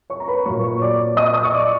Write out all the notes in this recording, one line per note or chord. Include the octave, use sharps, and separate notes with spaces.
C#5 C#6
A#5
B4 B5
A#2 F#3 A#3 C#5 C#6
C#5 C#6
D5 D6
D#5 D#6
D#5 D#6
C#6
D5 D6